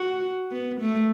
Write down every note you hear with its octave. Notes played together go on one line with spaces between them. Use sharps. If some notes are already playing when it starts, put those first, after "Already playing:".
Already playing: F#4
B3
A3